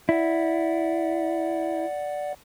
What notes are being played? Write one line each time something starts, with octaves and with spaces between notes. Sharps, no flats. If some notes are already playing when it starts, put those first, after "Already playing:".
E4 D5 F#5